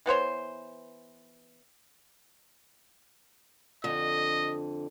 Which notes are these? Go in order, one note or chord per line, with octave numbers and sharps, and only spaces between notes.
E3 B3 C5 C#5
F2 D3 D#5